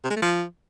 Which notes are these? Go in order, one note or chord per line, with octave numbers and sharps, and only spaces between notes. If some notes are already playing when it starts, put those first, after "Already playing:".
C3
G#3
A3
F3